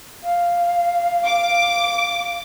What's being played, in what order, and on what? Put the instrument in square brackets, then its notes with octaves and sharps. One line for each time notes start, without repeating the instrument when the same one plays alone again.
[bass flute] F5
[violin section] D6